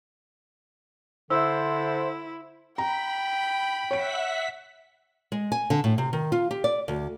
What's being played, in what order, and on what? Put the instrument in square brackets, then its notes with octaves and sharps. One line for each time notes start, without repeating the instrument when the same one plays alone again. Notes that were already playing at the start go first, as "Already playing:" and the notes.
[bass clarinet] D3 [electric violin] E4 [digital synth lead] C5 [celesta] E5 E6
[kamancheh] G5 [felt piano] A#5 [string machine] B5
[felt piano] C#5 D7 [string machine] E5 F#5 B6
[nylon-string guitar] G#3
G#5
D3
A2
C3
D#3
F4
G4
D5
D2